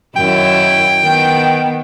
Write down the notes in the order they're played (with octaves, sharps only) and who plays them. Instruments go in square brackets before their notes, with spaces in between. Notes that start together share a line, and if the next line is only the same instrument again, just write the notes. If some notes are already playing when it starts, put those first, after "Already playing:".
[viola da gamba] F#2 D#3 E4 [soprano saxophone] G5
[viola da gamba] D#3 B3